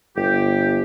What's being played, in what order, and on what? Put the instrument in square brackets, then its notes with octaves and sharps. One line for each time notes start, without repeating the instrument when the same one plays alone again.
[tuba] G1 [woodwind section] G4